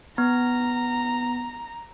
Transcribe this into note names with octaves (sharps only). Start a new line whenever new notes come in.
B3 A#5